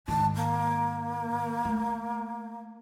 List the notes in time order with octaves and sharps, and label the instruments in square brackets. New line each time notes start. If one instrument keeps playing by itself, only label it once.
[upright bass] G#2 D#3 [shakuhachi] A5
[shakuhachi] A#3
[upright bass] A3